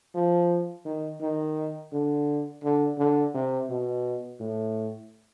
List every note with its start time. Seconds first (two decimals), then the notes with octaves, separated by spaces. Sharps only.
0.15 F3
0.85 D#3
1.21 D#3
1.92 D3
2.64 D3
2.98 D3
3.34 C3
3.69 B2
4.40 A2